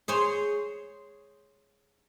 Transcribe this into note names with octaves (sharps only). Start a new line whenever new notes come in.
G#4 C5 C#5